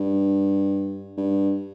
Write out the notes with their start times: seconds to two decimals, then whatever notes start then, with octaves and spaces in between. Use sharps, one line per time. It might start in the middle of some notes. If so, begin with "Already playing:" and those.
Already playing: G2
1.17 G2